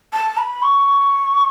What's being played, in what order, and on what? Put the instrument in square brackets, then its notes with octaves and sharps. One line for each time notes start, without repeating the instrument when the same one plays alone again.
[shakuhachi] A5
B5
C#6